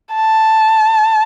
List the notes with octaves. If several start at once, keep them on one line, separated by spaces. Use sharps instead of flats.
A5